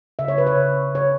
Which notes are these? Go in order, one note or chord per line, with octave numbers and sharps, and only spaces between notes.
C#3 E5
C#5
B4
C#5
C#3
C#3 C#5